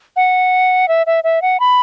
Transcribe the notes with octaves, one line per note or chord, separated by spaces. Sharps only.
F#5
E5
E5
E5
F#5
B5